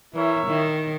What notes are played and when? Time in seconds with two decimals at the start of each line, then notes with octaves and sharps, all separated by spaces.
0.14 E3 E4 A#4 C#5 E5
0.47 D#3